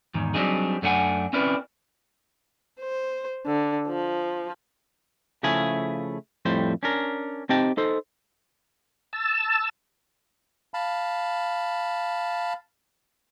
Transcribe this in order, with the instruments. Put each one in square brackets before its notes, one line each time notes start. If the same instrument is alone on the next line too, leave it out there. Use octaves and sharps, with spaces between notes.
[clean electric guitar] E2 G#2 D#3
F#3 G3 C4 D4 D#4 G#4
F#2 A3 D4 D#4 F#5 G#5
C4 C#4 E4 A#4 B4 D5
[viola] C5
D3
F3
[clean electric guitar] C#3 F3 A3 E4 G#4
F2 A2 G3 C5
C#4 D4 A#4
C4 D#4 G4 D#5 G5 A5
D#4 A4 C5
[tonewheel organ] A5 E6
[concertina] F5 A5 B5